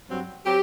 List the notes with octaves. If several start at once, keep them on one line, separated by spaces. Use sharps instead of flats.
G2 F#3 C4
F#3 C4 G4